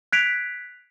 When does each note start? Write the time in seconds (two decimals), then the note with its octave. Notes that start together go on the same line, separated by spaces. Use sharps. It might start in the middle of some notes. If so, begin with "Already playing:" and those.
0.12 F#6 G#6 B6 C7 D7 F7